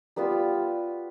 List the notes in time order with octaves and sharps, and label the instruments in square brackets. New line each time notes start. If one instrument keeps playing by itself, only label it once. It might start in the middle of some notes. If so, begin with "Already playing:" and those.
[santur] G3 B3 F4 B4